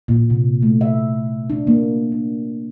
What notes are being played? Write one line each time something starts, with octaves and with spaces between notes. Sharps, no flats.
A#2
C3
A3
E5
D4
A#3
D4